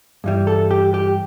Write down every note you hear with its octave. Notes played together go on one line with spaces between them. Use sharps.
G2 E3 G3
A4
G4
G4